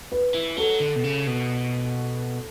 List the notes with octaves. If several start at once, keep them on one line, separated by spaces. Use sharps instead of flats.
B4
E3
F#3 A4
D3
B2
C#3
B2